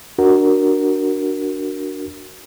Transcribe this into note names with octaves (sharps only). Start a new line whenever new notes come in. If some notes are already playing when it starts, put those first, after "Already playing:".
D4 F#4 A#4